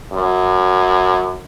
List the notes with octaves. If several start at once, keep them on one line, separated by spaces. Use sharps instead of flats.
F#2